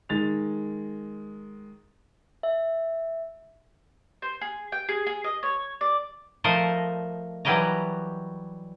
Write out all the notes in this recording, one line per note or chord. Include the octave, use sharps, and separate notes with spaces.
D#3 G#3 A6 F7
E5
C5
G#4
G5
G#4
G#4
D#5
C#5
D5
F3 A3 A#4 C5 D#5
E3 F#3 G3 G4 D#5 A#5